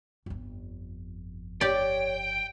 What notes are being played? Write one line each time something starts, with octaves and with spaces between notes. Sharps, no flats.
G1 F2
G4 C#5 D5 G5